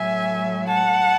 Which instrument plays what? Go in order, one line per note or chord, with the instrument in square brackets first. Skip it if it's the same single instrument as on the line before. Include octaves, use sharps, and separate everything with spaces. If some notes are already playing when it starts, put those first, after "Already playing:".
Already playing: [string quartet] A2 F#3 E5 G#5
F#5 A5